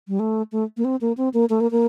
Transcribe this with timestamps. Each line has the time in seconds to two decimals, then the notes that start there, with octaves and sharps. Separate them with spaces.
0.08 G3
0.19 A3
0.52 A3
0.77 A#3
0.85 C4
1.01 A#3
1.17 C4
1.34 A#3
1.50 A3
1.61 A#3
1.71 A#3